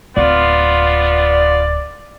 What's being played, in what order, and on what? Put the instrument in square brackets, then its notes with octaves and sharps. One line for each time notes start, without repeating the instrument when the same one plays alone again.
[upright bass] D1 [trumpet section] B3 F4 [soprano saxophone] D5